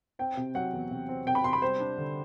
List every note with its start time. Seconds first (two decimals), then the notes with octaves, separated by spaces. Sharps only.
0.19 C4 G5
0.37 C3
0.55 F#3 F#5
0.73 E2
0.91 C3
1.09 C4
1.26 C3 G5
1.35 B5
1.44 C3 C6
1.53 B5
1.62 G3 C5
1.80 D4
1.98 D3